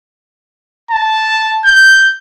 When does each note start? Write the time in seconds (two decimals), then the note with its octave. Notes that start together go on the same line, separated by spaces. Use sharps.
0.91 A5
1.65 G6